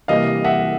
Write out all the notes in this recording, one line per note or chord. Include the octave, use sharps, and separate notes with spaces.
C3 E3 G3 A#3 D#5 F5
E5 F#5